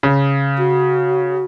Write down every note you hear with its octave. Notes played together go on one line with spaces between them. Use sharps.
C#3
F#4